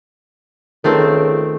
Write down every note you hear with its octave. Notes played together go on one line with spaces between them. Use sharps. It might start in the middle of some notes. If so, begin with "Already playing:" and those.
C#2 D#3 A3 C4